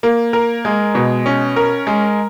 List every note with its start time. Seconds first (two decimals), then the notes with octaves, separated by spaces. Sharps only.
0.03 A#3
0.33 A#4
0.65 G#3
0.95 B2
1.26 C#4
1.56 A#4
1.87 G#3